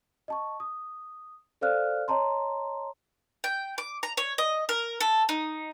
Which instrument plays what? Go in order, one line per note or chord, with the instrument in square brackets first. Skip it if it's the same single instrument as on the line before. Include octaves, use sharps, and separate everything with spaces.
[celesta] D#5 A5 C#6
D#6
A4 C5 D5 F5 F6 F#6
C#5 D#5 A5 A#5 C6
[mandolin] G5
D6
A#5
C#5
D#5
A#4
A4
D#4